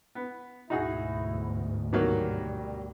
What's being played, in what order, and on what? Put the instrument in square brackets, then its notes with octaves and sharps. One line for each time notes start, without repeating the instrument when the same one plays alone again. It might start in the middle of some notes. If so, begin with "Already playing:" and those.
[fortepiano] B3
[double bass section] D2 G#2 B2 [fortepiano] D#4 F#4 G#4 [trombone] E4
[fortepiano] D#3 F#3 A#3 [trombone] G3